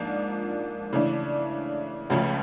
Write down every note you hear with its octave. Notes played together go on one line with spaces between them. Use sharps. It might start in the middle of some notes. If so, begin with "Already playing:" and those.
Already playing: G#2 F3 A#3 D4
C#3 E3 A3 D4
C#2 C#3 F3 A3